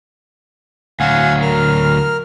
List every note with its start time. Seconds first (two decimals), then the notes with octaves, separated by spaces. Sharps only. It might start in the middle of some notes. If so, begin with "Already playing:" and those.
1.00 D2 F#3 F5 F#5 G#5
1.42 A#4 F6